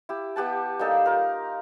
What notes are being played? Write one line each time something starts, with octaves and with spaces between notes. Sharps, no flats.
E4 G4
B3 G4 F#5 A5
G3 A#3 D#4 A4
F4 A#4